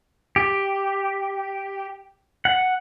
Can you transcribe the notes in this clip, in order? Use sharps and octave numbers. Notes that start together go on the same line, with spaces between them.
G4
F#5